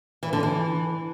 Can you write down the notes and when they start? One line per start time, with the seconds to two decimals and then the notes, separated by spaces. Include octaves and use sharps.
0.23 E3
0.33 D3
0.43 E3